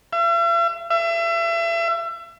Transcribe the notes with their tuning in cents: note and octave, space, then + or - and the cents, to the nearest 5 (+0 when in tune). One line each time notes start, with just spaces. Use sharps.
E5 +45
E5 +35